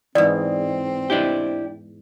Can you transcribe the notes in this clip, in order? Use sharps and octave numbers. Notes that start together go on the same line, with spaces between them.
E2 G#2 C4 D5
D4 E4 G4